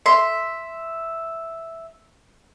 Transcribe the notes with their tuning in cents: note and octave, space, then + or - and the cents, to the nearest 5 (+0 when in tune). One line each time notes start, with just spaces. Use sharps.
E5 +0 C6 +0